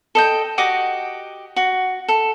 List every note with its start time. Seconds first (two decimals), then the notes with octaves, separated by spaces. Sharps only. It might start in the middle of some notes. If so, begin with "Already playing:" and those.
0.15 A4 D#5 G5
0.58 F#4 G4 D#5 D6
1.56 F#4
2.08 A4